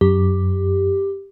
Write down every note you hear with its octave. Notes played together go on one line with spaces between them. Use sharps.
F#2 G4